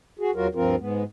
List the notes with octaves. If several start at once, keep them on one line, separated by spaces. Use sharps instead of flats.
F#4 G#4
E2 F#3 F4 F#4 A#4
D2 G2 F3 C4 F4 A#4
G#2 G#3 B3